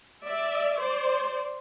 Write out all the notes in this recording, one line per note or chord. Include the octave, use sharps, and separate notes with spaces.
D5 E5
C5 D5